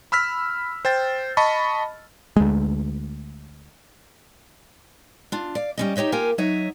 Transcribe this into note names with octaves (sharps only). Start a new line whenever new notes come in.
B5 E6 F6 B6
C5 G5 A6
D#5 A5 B5 C#6
D2 G#3
D4 F4
D5 F5
G3 C#4 D#5
D#4 G4 C#5 D#5 E5
A#3 F4 G4 A#4 F5 G#5
F#3 D#4 C#5 D#5 E5 F#5